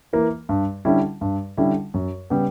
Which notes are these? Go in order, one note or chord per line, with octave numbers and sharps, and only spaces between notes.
E3 A#3
G2
D3 G3 C#4 E4
G2
D3 G3 C#4 E4
F#2
C#3 G3 B3